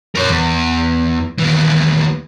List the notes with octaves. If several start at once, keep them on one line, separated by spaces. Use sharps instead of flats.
A#4 C#5
E2
D#2 E3